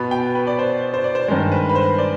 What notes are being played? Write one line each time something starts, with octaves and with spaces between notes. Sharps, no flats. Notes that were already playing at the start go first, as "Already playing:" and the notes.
Already playing: B2 B3 B5
G5
B4
D5
C5
C5
D5
C5
G2 D#3 G#3 C5
B4
B4
C5
D5